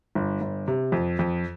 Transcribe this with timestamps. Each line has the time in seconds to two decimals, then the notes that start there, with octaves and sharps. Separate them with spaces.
0.15 G1
0.41 G1
0.68 C3
0.92 F2
1.19 F2